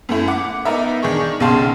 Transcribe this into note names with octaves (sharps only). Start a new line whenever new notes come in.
F#2 A3 E4
F#5 D6
B3 D#4 A#4 E5
D#3 D4 G#4 C#6
B1 C#3 G4 F5 A5 C6